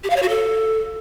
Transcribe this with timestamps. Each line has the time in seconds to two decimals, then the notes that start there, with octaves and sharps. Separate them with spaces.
0.04 G4
0.10 F5
0.16 C#5
0.23 F#4
0.29 A4